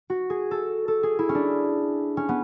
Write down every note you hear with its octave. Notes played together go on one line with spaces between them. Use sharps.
F#4
G#4
A4
A4
G#4
E4
C#4
D4
C#4
B3